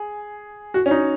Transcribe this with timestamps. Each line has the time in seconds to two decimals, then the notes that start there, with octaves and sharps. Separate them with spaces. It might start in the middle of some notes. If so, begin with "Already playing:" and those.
Already playing: G#4
0.74 F#4
0.86 C#4
0.91 D#4